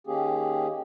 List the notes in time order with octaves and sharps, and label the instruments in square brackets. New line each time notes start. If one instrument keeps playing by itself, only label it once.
[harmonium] D#3 A#3 C#4 G4 G#4